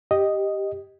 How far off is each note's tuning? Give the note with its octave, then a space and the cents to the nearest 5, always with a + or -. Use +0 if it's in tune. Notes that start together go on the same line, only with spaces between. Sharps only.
G4 +0 D#5 +0